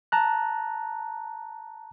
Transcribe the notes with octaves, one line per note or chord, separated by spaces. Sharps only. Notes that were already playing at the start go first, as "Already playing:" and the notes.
A5 A#5 F#6